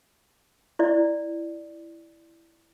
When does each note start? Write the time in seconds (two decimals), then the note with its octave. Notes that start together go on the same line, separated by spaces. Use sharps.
0.79 E4 D5